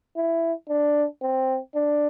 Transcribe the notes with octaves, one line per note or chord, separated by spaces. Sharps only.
E4
D4
C4
D4